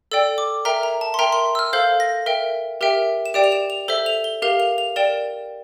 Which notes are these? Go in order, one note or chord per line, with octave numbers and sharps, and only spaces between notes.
A4 D5 G5 E6
D6
A#4 E5 G5 A#5
A#5
A5
C6
A#4 E5 G5 A#5
C6
E6
F6
A4 C5 F5 G6
A#6
A#4 E5 G5
G4 A#4 E5 G5
E7
G4 D5 G5 D7
F7
E7
F7
A4 C5 E5 G7
F7
G7
G4 A#4 F5 F7
F7
F7
A#4 D5 G5 E7